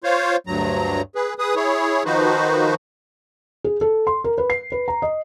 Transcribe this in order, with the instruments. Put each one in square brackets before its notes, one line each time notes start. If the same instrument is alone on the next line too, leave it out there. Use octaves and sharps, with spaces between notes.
[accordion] F4 C5 C#5 F5
D2 G2 F#3 A#5
G#4 B4
G#4 B4 D#6
E4 G#4 C#5
D#3 F3 D#4 F#4 B4 C5
[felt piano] G#4
A4
C6
A#4
B4
C7
B4
A#5
D#5